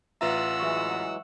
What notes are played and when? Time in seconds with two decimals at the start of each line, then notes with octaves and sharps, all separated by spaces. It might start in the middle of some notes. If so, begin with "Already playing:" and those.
0.21 A1 F4 B4 E5 F#5 A#5 E6
0.60 E3 F#3 G#3 E5 C#6